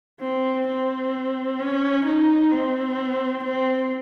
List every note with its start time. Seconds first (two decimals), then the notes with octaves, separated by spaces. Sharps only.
0.20 C4
0.67 C4
1.59 C#4
2.05 D#4
2.51 C4
3.43 C4